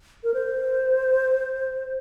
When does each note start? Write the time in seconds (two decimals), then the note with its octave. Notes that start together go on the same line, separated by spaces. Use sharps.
0.23 A#4
0.34 C5